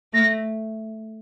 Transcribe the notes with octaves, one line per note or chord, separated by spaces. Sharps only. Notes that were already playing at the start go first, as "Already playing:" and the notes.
A3 A#6